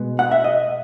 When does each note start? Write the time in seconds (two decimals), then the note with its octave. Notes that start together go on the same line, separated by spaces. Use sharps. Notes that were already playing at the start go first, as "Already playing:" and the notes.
Already playing: B2 G#3 B3
0.19 F#5
0.32 E5
0.44 D#5